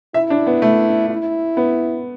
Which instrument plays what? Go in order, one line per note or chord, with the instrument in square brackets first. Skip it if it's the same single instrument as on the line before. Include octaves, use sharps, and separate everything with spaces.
[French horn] E4 [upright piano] E5
[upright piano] D4
B3
A3
[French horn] E4
[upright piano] B3